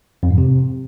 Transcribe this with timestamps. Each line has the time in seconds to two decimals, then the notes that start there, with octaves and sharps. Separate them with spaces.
0.23 F2
0.30 G#2
0.38 C3